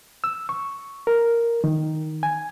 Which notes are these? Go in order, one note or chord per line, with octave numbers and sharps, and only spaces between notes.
E6
C#6
A#4
D#3
G#5